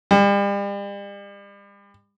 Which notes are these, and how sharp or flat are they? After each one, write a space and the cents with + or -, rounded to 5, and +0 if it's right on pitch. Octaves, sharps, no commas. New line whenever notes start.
G3 +40